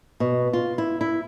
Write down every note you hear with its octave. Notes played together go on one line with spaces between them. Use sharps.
B2
F4
E4
E4